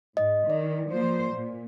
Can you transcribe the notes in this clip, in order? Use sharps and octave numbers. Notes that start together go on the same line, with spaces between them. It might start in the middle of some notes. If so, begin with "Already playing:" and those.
G#2 D#5
D#3 D5
F3 A#3 C5
A#2